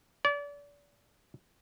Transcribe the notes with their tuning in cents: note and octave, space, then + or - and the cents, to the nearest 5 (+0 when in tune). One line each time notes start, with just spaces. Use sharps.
D5 -35